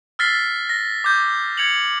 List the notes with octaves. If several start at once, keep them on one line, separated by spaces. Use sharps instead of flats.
E6 F6 A6 B6 C7 G7
A#6
D6 G6
G#6 C#7 F7 F#7